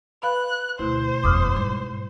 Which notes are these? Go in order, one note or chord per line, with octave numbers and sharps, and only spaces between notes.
B4 F5 B5 F#6
D2 B2 A3 E4 C5
F#1 E2 D6 D#6 F6
G#2 G3